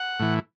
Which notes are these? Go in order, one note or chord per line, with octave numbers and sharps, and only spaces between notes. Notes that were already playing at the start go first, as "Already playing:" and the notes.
Already playing: F#5
A2 E3